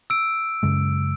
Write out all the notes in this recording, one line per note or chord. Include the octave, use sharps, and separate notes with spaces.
E6 D7
F#2 C#3 G#3